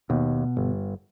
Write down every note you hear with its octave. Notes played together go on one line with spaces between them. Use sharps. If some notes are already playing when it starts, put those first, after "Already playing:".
D#2 B2
G1